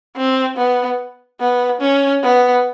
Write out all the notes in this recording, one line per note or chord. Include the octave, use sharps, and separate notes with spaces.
C4
B3
B3
C#4
B3